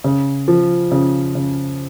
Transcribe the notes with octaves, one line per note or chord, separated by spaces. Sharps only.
C#3
F3
C#3
C#3